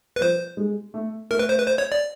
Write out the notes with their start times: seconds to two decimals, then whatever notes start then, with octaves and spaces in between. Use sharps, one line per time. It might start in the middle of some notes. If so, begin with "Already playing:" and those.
0.16 B4
0.21 F3 C5
0.57 G#3
0.94 A3
1.31 A3 A#4
1.39 B4
1.49 C5
1.58 B4
1.67 C5
1.78 C#5
1.92 D5